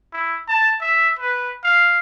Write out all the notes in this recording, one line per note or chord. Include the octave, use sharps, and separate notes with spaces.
E4
A5
E5
B4
F5